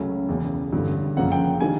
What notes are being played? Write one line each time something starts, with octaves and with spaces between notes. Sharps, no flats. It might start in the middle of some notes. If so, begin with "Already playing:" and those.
Already playing: C#2 C#3 F#3 A3 C#4
E1 E2 C#3
A1 G2 D3
F#1 F#2 C#3 F3 A#3 F#5
G5
D#3 G3 A#3 D4 G#5